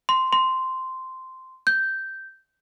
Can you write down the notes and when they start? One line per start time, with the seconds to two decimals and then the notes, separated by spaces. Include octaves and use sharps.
0.09 C6
0.33 C6
1.67 G6